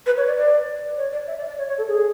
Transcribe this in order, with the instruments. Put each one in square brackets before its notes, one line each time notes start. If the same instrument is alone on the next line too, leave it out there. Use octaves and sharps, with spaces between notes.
[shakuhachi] B4
C#5
D5
D5
C#5
D5
E5
D5
D5
C#5
C#5
A4
G#4